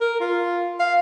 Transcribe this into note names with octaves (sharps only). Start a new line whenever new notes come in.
A#4
F4
F5